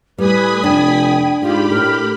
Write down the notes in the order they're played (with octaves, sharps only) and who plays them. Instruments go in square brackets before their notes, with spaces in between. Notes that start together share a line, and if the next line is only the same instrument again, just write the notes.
[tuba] A2 [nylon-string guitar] G3 [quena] B4 [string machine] G#5 B5 D#6
[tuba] F1 [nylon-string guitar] D4 [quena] G5
[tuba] G#2 [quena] F4 [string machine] G4 B5
[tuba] A2 [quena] A#4